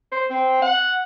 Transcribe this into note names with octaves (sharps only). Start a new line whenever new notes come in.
C5
C4
F#5